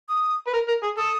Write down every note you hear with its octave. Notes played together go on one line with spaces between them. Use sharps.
D#6
B4
A#4
A#4
G#4
A4 D#6